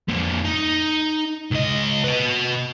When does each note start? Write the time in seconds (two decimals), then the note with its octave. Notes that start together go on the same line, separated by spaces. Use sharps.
0.08 F2 A#2
0.45 D#4
1.51 C#2 D#5
2.04 B4 D#5